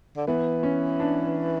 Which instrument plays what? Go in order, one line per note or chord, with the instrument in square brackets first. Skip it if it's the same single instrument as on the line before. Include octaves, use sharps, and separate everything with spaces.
[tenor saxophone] D3
[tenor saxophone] E3 [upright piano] B3
[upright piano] C#4
D4